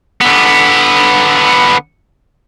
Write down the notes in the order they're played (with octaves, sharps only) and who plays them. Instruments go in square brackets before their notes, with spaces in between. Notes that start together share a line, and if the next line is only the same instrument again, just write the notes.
[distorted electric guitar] D3 B3